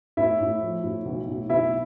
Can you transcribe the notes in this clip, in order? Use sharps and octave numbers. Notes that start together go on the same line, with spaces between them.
A2 E4 E5
A2
F3
A2
B1
A2
B1 E4 E5